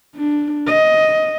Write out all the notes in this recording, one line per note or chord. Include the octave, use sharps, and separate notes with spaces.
D4
D#5